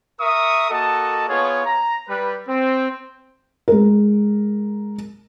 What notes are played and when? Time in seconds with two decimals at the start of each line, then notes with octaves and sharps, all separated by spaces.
0.20 A#4 E5 C#6 D#6
0.70 A#3 F#4 A4 D#5 A5
1.29 B3 F4 G#4 C#5
1.66 A#5
2.08 G3 B4
2.46 C4
3.68 G#3 A#4